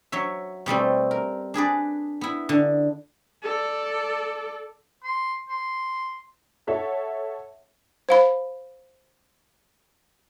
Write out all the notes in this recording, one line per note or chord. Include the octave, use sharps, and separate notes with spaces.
F#3 C#5 E5
B2 G3 A3 C4
A#4
D4 G#4 B4 D5
B3 E4
D3
A4 D5
C6
C6
A4 C#5 E5 F#5
C5 F5 B5